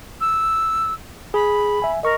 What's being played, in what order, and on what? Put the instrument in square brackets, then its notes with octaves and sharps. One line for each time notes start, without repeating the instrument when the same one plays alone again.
[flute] E6
[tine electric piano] G#4 [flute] B5
[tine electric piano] E5 G#5
[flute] A#4 [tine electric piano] D#5 C#6